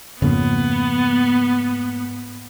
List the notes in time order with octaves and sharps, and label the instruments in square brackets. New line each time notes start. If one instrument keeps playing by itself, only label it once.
[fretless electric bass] F2 C#3 [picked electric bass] G#2 A#3 [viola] B3